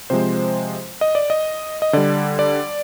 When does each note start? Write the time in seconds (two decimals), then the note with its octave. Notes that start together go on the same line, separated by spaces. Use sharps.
0.10 C3 F3 G#3 C5
1.01 D#5
1.15 D5
1.30 D#5
1.82 D#5
1.93 D3 G3 D5
2.39 D5